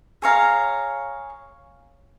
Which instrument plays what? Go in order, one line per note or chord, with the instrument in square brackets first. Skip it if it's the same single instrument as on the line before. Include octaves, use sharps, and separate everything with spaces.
[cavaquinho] G#4 C#5 F5 A#5